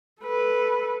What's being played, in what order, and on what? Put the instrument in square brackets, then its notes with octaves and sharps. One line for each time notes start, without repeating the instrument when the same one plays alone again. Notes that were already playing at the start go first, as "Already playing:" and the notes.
[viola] A4 B4